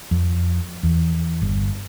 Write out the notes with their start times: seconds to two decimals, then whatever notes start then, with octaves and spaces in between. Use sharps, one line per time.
0.11 F2
0.83 E2
1.42 G1